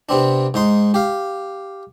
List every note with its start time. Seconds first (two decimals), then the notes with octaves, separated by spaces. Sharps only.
0.09 C3 B3 C4 D4
0.54 G#2 D#4 C6
0.94 G4 F5